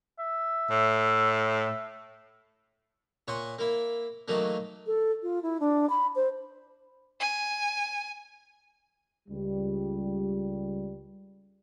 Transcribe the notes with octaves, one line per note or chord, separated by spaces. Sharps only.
E5
A2
A#2 C#5 F#5 G#5 C6
A#3 E4
D#3 E3 F#3 A3 A#3
A4
F4
E4
D4
B5
C5
G#5
C#2 G3